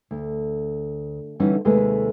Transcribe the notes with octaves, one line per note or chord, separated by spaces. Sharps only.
D2
D3 E3 G3 C#4 D#4
D#2 C3 G#3 A3 B4